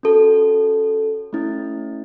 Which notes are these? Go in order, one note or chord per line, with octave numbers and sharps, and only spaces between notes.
C#4 F#4 A4
A3 C#4 E4